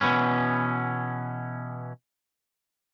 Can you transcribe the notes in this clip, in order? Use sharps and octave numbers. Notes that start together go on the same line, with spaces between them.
B2 E3 B3 C#4